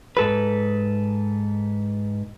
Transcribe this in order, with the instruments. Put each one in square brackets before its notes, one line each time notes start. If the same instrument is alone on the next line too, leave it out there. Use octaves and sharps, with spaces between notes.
[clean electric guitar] G#2 A4 B4